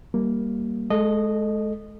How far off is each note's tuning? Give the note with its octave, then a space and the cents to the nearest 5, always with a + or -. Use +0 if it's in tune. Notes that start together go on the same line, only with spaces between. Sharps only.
G3 -5 A#3 +0
G#3 +30 A4 +0 D#5 -15